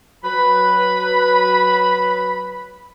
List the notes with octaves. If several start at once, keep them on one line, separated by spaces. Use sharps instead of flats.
F#3 B4 B5